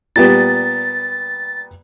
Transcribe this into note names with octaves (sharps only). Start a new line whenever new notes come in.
A#2 G3 B3 A6